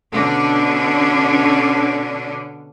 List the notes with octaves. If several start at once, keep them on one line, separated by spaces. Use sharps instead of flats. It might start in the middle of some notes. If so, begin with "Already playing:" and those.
B2 D3 C#4 D4